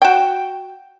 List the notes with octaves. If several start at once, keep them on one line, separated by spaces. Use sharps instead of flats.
F#4 G5